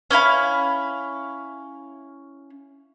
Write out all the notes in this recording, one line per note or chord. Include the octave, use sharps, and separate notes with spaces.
C#4 E4 F5 B5